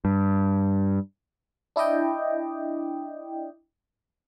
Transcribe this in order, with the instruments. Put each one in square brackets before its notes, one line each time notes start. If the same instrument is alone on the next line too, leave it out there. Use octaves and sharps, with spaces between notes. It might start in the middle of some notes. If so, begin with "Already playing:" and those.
[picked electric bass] G2
[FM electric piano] D4 E4 D5 D#5 G5